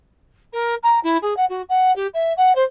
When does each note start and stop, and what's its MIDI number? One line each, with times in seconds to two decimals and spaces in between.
0.53 0.75 70
0.83 0.99 82
1.03 1.18 64
1.22 1.36 68
1.37 1.45 78
1.49 1.62 66
1.69 1.95 78
1.96 2.07 67
2.14 2.33 76
2.37 2.55 78
2.55 2.64 72